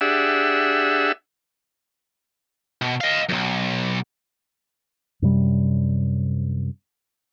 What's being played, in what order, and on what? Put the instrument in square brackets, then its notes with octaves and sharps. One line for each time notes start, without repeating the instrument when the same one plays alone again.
[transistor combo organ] D4 G4 G#4 E5 F#5 E6
[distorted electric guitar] B2
D#5 F5
B1 F#2
[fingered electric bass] F#2 C3 G3